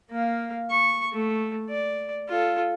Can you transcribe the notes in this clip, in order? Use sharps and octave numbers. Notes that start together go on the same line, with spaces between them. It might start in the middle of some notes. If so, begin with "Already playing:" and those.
A#3 F5
C#6
A3
D5
F4 A4